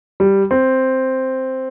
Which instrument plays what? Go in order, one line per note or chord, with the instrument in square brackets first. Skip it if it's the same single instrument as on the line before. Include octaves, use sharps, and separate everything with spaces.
[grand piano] G3
C4